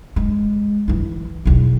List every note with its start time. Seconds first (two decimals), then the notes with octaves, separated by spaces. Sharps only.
0.16 G#3
0.88 E3 E4
1.45 B1 E2